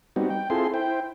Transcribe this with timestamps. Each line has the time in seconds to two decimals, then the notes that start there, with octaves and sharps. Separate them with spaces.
0.16 G3 B3 C4 D#4 F#4
0.30 G5
0.50 C4 E4 F4 G#4 A4 C6
0.74 E4 C5 G5